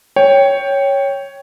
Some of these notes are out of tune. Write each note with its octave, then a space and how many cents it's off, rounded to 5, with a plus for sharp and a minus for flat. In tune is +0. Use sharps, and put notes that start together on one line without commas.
C#5 +0 G5 +0